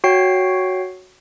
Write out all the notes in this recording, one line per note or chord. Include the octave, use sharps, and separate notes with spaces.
F#4 C#5 G5 C7